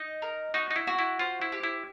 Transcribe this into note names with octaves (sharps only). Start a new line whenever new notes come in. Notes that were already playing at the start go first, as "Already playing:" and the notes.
Already playing: D#4 D#5
A#4
D#4 F#4
D#4
E4
F#4
E4
F4 C5
E4
G4
E4